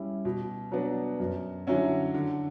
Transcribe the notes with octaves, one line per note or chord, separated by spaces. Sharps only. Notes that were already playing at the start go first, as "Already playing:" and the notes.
Already playing: G3 C#4 E4
B2
F#3 B3 D4
F#2
D3 F#3 C#4 E4
D3